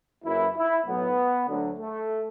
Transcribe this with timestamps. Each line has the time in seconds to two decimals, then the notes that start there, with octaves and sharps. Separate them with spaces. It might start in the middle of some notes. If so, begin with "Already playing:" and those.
0.23 F#1 F#2 E3 E4
0.56 E4
0.86 B1 A2 F#3 B3
1.48 D2 D3 F#3
1.78 A3